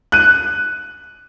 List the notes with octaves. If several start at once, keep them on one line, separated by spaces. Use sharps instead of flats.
F#6 D#7